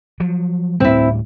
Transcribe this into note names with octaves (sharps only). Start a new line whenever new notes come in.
F3 F#3
D2 A2 G3 C4 E4